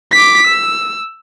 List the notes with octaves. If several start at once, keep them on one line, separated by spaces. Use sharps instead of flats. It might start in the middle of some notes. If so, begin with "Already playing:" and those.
D6 B6
E6